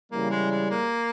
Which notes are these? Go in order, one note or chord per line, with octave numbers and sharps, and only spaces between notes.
C#3 E3 G3 A#3
G#3
G#3
A#3